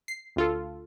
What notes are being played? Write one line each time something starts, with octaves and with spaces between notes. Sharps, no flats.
C7
D2 F4 A4